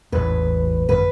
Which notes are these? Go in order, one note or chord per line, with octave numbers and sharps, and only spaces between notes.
A1 E2 G#2 B4
G#1 F#2 B4